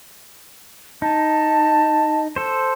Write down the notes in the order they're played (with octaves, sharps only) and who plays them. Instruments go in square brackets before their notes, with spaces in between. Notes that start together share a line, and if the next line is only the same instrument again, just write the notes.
[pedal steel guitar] D#4 [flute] A5
[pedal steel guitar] A4 C5